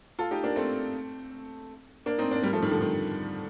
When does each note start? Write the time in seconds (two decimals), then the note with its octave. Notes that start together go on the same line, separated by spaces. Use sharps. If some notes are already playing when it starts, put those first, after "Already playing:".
0.19 F4 A4
0.31 D#4 G4
0.44 A#3 D4
0.56 A3 C4
2.06 A#3 D4
2.19 C4 D#4
2.31 A#3 D4
2.43 G3 A#3
2.53 F3 A3
2.62 D#3 G3
2.71 D3 F3
2.81 D#3